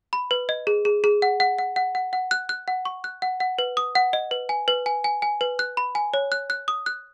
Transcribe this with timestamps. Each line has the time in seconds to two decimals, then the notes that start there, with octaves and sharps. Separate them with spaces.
0.13 B5
0.31 B4
0.49 D#5
0.67 G#4
0.85 G#4
1.04 G#4
1.22 F#5
1.40 F#5
1.58 F#5
1.76 F#5
1.95 F#5
2.13 F#5
2.31 F#6
2.49 F#6
2.68 F#5
2.85 C#6
3.04 F#6
3.22 F#5
3.40 F#5
3.59 B4
3.77 D#6
3.95 F#5
4.13 D#5
4.31 B4
4.49 G#5
4.68 B4
4.86 G#5
5.04 G#5
5.22 G#5
5.41 B4
5.59 F#6
5.77 B5
5.95 G#5
6.14 C#5
6.32 F#6
6.50 F#6
6.68 D#6
6.86 F#6